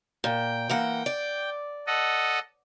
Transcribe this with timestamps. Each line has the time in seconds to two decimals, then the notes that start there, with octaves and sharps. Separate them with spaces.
0.24 A#2 G5
0.69 E3 A#3 F#5
1.06 D5
1.87 A4 D#5 F#5